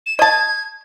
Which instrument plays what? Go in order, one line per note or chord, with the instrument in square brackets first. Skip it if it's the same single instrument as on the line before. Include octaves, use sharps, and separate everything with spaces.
[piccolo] E7
[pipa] D#5 A5 [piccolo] G#6